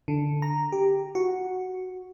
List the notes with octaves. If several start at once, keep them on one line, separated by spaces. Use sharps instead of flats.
D3
A#5
G4
F#4